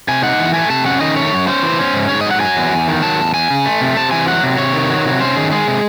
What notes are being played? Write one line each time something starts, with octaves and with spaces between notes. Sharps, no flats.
C3 G#5
D#4 F#5
E3
A3 G#5
C3 A5
C#4 F#5
D#3 D#5
A3 C#5
F#2
C#4 C5
E3
C#4
G#2
G#2 C#5
D#5
F#3
F#5
F#3 G#5
E2
E2
D#3
F#3 A5
E2
E2 G#5
C#3
A3
C3
C3 A5
E3 G#5
F#3 F#5
C3
C3 C#5
D#3
F#3
C3
C#4 C5
D#3 G#4
G#3 G#4
C3